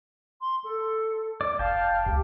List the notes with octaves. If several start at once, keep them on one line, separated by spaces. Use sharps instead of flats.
C6
A4
D5
F1 F5 G5 A5
C#2 G4